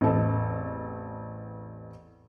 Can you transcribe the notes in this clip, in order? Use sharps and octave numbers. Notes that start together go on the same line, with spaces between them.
A1 E2 C4 A4 D#5